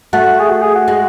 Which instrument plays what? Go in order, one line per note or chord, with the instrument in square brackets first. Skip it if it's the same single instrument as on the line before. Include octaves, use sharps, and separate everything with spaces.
[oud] A3 [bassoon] F#4
[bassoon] G#4
F#4
G#4
F#4
[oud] G#3